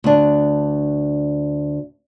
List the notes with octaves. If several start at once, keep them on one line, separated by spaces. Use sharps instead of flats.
D2 D4